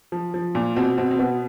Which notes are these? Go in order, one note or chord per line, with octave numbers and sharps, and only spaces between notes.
F3
F3
A#2
B2 C4
B2 C4
C4
B2 B3